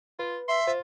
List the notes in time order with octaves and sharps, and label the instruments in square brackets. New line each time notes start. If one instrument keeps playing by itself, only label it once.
[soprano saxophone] F4 [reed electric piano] B4
[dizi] E5 [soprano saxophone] C6
[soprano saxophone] F4 [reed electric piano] C5